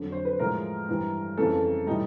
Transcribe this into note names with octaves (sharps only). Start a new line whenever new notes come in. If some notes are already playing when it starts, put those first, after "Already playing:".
Already playing: F2 D3 F#3
C5
B4
A2 F3 G#3 A#4
G2 E3 G3
F2 C#3 E3 A4
A2 E3 G3 D#4